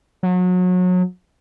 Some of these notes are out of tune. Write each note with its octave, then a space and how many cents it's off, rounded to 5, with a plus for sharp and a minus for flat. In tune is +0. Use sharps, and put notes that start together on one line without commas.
F#3 -30